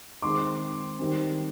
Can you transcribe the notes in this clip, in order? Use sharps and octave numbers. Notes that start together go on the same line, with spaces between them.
D#3 G#3 C4 C6 D6
D#3 G3 C4